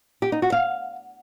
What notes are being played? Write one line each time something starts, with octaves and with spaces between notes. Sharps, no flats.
G4
D#4
F#4
F5